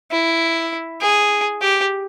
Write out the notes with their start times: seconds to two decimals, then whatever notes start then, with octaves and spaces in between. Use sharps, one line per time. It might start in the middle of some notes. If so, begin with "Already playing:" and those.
0.11 E4
1.01 G#4
1.62 G4